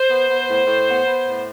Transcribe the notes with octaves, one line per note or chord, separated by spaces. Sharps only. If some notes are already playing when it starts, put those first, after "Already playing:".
Already playing: C5
B3
B3
A2
A2
B3
B3
A2